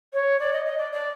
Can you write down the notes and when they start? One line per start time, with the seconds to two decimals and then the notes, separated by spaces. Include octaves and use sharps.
0.13 C#5
0.39 D5
0.53 D#5
0.65 D#5
0.78 D5
0.92 D5